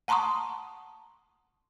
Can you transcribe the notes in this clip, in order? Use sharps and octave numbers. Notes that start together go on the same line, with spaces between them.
F#5 A5 A#5 C6 C#6 D#6